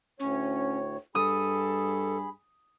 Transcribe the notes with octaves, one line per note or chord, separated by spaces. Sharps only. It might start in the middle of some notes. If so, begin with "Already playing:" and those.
D2 A2 C#4 C#5
G2 G#4 A4 B5 D#6